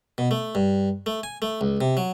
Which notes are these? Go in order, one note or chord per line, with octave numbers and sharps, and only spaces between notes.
B2
A3
G2
A3
G#5
A3
C#2
C3
F#3